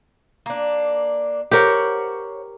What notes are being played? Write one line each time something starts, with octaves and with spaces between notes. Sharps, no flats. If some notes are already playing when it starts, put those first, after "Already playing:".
A#3 D4
G4 A#4 C5 C#5 F#5